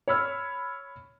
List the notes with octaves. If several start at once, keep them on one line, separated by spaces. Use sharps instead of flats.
C#5 B5 E6 F6